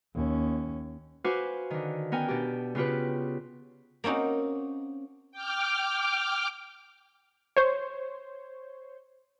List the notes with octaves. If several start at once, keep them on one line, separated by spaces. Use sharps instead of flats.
D#2 C#4
F#4 B4 C5 F5 G#5 D6
D3 D#3
B3 C#4 A#4 G5 G#5
B2 D4 G4
C#3 B3 F4 G4 B4
A#3 C4 C#4 D#4 F#4
G5 D6 F6
C5 C#5